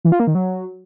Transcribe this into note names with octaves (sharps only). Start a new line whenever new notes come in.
E3
F4
A#3
D#3
F#3